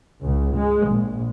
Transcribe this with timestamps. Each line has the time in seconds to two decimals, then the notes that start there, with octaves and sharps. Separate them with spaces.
0.23 C#2
0.55 G#3
0.90 A#1